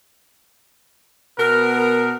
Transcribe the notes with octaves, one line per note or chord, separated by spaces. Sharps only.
B2 B3 A#4